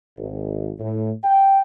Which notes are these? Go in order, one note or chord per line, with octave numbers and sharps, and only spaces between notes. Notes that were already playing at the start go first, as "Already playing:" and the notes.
G#1
A2
G5